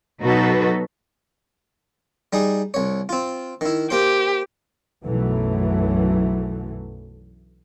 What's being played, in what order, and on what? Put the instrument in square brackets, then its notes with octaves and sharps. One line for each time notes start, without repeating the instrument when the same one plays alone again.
[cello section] B2 F#3 D#4 F#4 A4 B4
[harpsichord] G3 D#4 G#4
C2 C#5
C4 F4
D#3 E4
[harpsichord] A#3 C5 C6 [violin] G4
[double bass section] B1 F#2 B2 E3 F#3 A3